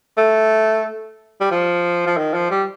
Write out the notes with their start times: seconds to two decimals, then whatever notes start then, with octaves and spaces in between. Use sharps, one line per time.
0.17 A3
1.41 G3
1.51 F3
2.06 F3
2.17 D#3
2.34 F3
2.51 G3